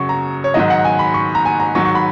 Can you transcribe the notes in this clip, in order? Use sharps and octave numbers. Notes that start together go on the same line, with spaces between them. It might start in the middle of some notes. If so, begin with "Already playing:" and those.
Already playing: F#2 C#3 F#3 C#6
A#5
C#5
G#2 D#3 F#3 D#5
F#5
G#5
B5
C#6
A#5
G#5
A#5
G#2 D#3 F#3 C#6
C#6
B5